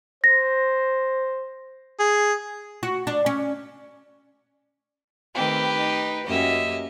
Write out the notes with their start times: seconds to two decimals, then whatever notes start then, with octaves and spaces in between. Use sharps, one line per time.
0.24 C5 A#6
1.99 G#4
2.83 F#4
3.07 D4
3.26 C#4
5.35 D#3 A3 C4 G4 B4
5.76 D#4
6.27 F#2 A#3 G4 D#5 E5